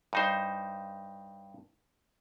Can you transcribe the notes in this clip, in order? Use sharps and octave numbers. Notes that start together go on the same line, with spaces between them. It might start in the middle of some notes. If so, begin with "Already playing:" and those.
G2 D#4 C5